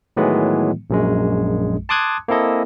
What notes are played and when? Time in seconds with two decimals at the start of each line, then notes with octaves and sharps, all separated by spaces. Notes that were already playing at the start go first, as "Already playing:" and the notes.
0.17 A2 D#3 E3 F#3 G#3 B3
0.90 A#1 F#2 G#3
1.89 A5 C6 D6 D#6 F#6 G#6
2.28 A#3 C4 E4 A4 D#5